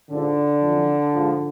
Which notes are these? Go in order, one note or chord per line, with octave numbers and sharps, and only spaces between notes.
G#2 D3 F3 D4
F2 E3
G#2 F3